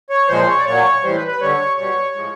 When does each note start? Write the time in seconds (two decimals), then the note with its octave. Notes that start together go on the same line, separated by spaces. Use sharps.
0.10 C#5
0.28 A#2 F3 G#3 C5
0.47 C#5
0.58 D5
0.66 A#2 F#3 C#5
1.02 A2 E3 G3 C5
1.15 B4
1.27 B4
1.40 D3 G3 C#5
1.77 B2 G3 C#5
2.15 A2 F3 G#3